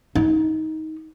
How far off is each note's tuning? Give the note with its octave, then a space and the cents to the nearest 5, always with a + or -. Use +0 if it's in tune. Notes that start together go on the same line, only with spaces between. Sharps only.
D#4 +20